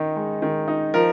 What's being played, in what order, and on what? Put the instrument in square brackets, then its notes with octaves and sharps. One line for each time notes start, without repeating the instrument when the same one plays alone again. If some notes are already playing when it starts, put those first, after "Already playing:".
Already playing: [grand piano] D#3 D#4
G#3
D#3
D#4
F3 A#4